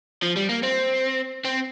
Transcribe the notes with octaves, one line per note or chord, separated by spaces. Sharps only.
F3
G3
A#3
C4
C4